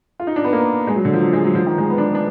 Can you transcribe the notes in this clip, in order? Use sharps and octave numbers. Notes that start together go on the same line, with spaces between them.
F4
D#4
D4
B3
A#3
G#3
F#3
D3
F3
F#3
G#3
F#3
F3
D#3
G#3
B3
D4
B3
D4